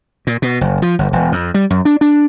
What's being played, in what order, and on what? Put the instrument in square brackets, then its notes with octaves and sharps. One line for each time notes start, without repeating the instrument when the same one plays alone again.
[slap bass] A#2
B2
F#1
F3
G1
E1
F2
G3
F#2
D4
D4